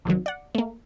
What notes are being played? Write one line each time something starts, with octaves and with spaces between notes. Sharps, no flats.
C#2 C3 D#3 F#3
D5 F#5
A3 A#3